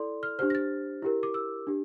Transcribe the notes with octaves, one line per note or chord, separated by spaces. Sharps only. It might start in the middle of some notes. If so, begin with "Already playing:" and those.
Already playing: E4 A4 D5 C6
F6
D4 G4 C5 F6
A#6
A6
E4 G4 A#4
D6
E6
D4 G4